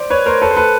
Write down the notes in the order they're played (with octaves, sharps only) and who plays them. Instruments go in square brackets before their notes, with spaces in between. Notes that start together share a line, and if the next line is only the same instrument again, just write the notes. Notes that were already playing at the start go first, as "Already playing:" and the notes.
Already playing: [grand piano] C5 D5
B4 C#5
A#4 C5
A4 B4
C5
A4 B4